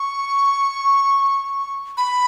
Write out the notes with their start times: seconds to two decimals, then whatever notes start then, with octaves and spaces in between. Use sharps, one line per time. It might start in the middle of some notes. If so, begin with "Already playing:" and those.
Already playing: C#6
1.97 B5